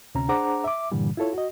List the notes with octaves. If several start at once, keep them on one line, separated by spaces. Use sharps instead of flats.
D2 C3 C#4 A#5
D4 G#4 C5 F#5 A#5 D6
E5 D6
G2 A#2 D3 E3 G3
E4 F4 A4 C#5
F#4 D#5